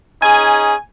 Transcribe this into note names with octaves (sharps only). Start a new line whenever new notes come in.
C#4 D#4 G#4 G#5